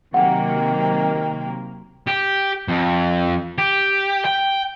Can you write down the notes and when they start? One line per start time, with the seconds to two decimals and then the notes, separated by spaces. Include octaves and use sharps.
0.14 C3 D#3 F#3 A#3 F#5 G5
2.07 G4
2.68 F2
3.58 G4
4.25 G5